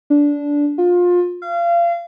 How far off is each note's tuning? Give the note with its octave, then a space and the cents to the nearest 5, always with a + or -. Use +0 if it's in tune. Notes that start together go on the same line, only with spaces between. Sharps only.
D4 -15
F4 +25
F5 -30